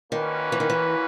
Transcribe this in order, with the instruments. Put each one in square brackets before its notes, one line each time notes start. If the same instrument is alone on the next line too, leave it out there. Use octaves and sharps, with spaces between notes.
[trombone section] A#2 A#3 C#4 F#4 B4 [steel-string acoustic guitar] D#3
[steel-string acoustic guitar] E3
D#3
E3